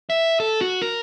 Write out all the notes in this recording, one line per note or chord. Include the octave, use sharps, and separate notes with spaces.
E5
A4
F#4
A#4